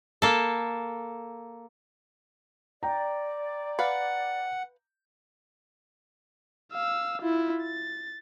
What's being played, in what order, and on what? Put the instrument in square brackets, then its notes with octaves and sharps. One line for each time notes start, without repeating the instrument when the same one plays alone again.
[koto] A#3 A4
[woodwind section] D5 [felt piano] G5 A#5
[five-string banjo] B4 F5 [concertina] F#5
[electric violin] F5 E6
E4 F4
A6